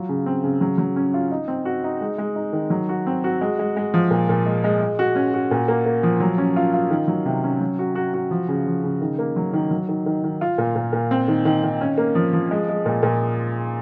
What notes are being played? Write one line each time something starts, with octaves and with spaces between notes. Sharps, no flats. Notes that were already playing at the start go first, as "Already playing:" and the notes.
Already playing: F#3 F4
C#3
C4
C#3
F#3
F#3
C#4
F4
D#4
C4
F#4
D#4
G#3
G#3
D#4
D#3
F#3
F#4
C4
F#4
G#3
G#3
G#3
F3
A#2
A#2
G#3
G#3
G#3
F#4
C#4
F#4
A#2
A#3
A#3
F3
F#3
C#4
F4
F4
D#3
F#3
C3
C#4
F#3
F#4
F#4
F#4
F3
C#3
F3
C#3
D#3
A#3
F#3
D#3
F#3
D#3
D#3
D#3
F4
A#2
A#2
A#2
C4
D#3
D#3
D#3
C#4
A#3
F3
F3
G#3
G#3
A#2
A#2